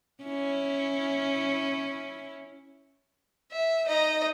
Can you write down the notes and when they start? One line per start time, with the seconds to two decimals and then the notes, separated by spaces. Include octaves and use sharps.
0.23 C#4 E4
3.52 E5
3.85 D#4 D#5 A#5